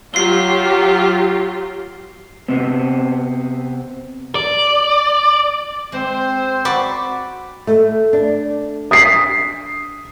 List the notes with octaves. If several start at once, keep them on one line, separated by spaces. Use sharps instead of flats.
F#3 F4 G4 C7 G7
C3 B3 C4
D5
G#3 C4 C5
F#4 D5 B5 C#6
A3
D4
D#6 B6 C7